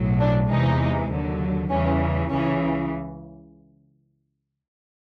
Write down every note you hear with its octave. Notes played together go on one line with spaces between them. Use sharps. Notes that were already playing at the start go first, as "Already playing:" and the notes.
Already playing: B1 A2 F#3
D4
E2 C3 E3 G#3 D#4
D#2 D3 F#3
E2 C#3 E3 G3 C#4
C#2 C#3 E3 C#4